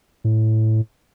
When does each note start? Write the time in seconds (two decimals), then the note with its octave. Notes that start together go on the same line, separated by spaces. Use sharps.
0.24 A2